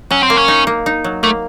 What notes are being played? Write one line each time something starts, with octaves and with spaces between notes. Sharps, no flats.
F#3 C#4
C4
A#3
C#4
D#4
A#3
D#4
F#3
A3 A#3